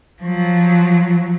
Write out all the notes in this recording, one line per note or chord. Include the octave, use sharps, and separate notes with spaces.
F3 F#3